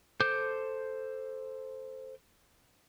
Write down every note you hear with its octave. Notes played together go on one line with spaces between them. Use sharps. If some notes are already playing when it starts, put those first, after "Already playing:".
A4 C5 D6 G6